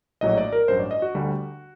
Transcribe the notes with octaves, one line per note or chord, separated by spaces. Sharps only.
A#1 A2 F#3 D#5
D5
A#4
A1 G2 F#3 C5
D5
D#5
F#4
D2 D3 G3